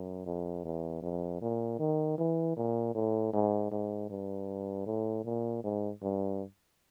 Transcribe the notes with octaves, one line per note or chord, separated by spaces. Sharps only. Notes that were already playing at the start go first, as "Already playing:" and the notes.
Already playing: F#2
F2
E2
F2
A#2
D#3
E3
A#2
A2
G#2
G#2
G2
A2
A#2
G#2
G2